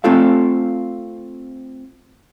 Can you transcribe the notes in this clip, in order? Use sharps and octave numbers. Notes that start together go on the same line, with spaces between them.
A3 C4 F4 A4 F5